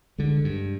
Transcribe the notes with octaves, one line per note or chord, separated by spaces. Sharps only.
D3 G#3
G2